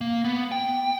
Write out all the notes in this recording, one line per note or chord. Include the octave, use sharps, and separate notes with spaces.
A#3
B3
G5